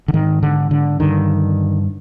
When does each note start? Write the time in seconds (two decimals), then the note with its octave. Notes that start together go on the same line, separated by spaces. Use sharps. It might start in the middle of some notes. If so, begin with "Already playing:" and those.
0.08 D3
0.13 G#2 D#3
0.43 D3
0.71 D3
1.00 G2 D3 D#3